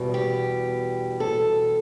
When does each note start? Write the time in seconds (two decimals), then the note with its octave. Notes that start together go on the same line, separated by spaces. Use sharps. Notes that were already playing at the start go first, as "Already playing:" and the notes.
Already playing: E2 B2 G3
0.14 G4
1.20 A4